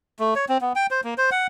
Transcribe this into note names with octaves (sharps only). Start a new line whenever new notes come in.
A3
C#5
C4
B3
G5
C5
A#3
C5
F#5